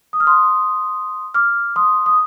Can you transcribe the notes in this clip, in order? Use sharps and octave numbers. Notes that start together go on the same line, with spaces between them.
D#6
F6
C6 D#6
D6 F6
C6 D#6
D#6